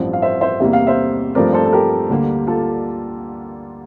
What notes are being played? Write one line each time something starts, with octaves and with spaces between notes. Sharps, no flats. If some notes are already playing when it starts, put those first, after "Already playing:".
Already playing: A1 G2 F3 C4
F5
C5 E5
C5 E5
E2 C3 G3 A#3 E5
F5
C5 E5
G2 F3 A3 C4 A#4 D5
A4 C5
A4
G4 A#4
D2 D3 G3 A#3
F4 A4